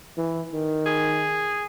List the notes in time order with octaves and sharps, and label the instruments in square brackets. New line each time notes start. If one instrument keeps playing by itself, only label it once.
[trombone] E3
D#3
[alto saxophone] G#4